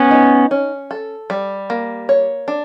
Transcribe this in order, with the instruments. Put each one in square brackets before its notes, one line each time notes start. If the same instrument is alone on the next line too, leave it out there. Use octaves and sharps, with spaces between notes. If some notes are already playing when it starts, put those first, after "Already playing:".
Already playing: [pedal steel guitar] B3 C#4
[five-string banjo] D#4
C#4
A4
G3
A#3
C#5
D4